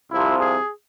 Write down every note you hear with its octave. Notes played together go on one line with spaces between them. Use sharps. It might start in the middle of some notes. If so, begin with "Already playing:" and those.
C2 C3 F3 E4
G#4